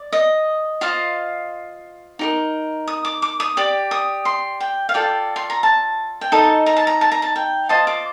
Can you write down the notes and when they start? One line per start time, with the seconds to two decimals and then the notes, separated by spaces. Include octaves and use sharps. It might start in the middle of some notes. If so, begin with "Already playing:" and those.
Already playing: D5
0.12 D#5
0.81 F4 C5 D#5 F5
2.19 D#4 G4 A#4
2.87 D#6
3.05 D6
3.22 D6
3.40 D#6
3.57 G4 D5 D6
3.91 D#6
4.25 C6
4.60 G5
4.89 F5
4.94 F4 A4 D5 G5
5.36 C6
5.50 A#5
5.63 A5
6.21 G5
6.32 D#4 A4 D#5 A5
6.66 A#5
6.76 A5
6.87 A#5
7.01 A5
7.12 A#5
7.22 A5
7.36 G5
7.69 F4 C5 D#5 A5
7.87 D6